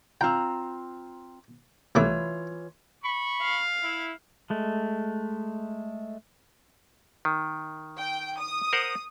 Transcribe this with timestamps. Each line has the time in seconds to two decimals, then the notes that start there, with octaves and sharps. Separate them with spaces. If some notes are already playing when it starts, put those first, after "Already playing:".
0.21 C4 F4 G5 A#5
1.95 C2 E3 A3 F4 C#5 D6
3.04 B5 C#6
3.41 F5
3.83 E4
4.50 G#3 A3
7.25 D#3
7.98 G5
8.39 D#6
8.73 A#4 C5 F#5